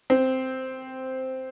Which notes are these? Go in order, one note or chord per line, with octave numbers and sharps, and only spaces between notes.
C4